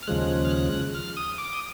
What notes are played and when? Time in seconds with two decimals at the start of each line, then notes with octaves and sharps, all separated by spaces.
0.03 F6
0.07 D#2 C#3 F3 G#3 F#6
0.45 F6
0.51 F#6
0.95 F6
1.17 D#6
1.38 D6
1.53 D#6